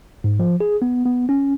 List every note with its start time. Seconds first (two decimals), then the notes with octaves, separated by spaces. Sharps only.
0.24 G#2
0.39 F3
0.60 G#4
0.82 B3
1.06 B3
1.29 C#4